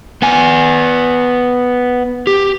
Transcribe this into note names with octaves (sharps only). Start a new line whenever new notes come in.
B3 G#5
G4